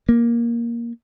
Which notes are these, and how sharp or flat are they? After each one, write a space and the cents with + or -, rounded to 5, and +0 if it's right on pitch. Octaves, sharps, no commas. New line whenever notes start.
A#3 +10